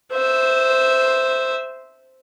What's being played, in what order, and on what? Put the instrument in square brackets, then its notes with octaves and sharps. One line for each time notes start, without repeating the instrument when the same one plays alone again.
[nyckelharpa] C5 E5